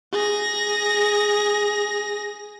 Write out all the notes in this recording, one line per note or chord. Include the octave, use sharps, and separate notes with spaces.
G#4 A#6